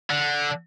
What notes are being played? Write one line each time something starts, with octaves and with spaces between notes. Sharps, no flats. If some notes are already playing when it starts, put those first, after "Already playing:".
D3